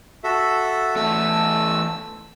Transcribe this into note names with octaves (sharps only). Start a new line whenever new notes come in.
F#4 A4 E5
E2 A3 A4 E6